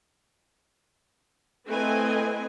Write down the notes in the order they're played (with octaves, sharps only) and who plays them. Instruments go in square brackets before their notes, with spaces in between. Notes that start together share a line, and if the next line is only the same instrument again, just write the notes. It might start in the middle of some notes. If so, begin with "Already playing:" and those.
[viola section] A3 C4 E4 B4 D#5 G#5